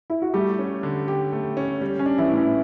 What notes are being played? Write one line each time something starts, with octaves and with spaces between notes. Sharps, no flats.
E4
F#4
G3 A3 G4
C#4
D3
G4
A3
C#4
G3
C#4
D4
E3 E4
A2
C#4